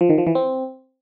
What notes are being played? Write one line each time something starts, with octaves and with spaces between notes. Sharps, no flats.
F3
D#3
F3
E3
C4